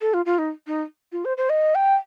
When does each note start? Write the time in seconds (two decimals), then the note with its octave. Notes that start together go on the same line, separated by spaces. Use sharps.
0.01 A4
0.14 F4
0.26 F4
0.38 D#4
0.67 D#4
1.12 F4
1.25 C5
1.37 C5
1.49 D#5
1.75 G5